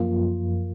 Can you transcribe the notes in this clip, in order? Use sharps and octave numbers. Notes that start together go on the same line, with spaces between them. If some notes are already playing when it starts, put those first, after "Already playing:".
Already playing: F#2 F3 A#3 F4